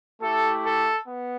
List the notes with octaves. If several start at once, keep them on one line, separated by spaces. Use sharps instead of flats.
A3 E4 G4 A4
A4
B3